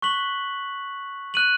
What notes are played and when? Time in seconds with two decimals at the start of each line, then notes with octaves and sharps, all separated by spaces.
0.02 C#6 F#6 B6 F#7
1.34 F#6 D#7 F#7